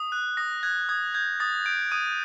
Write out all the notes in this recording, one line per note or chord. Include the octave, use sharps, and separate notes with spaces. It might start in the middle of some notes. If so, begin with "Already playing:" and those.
Already playing: D#6
F#6
D#6 A#6
F#6 G#6
D#6 G#6
G6 G#6
D#6 A6
G6 D7
D#6 D#7